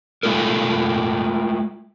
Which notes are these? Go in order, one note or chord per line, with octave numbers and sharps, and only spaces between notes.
G#3 A3 F4 A4 A#4